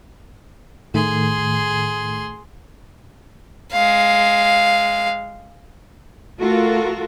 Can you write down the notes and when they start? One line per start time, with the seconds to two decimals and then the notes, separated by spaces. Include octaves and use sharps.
0.94 A2 D#3 A3 G#4 C6
3.73 G#3 F5
6.40 A3 F4 F#4 A4 A#4